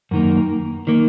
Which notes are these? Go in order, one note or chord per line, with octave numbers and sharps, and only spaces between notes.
F#2 D#3 A#3
D#3 A#3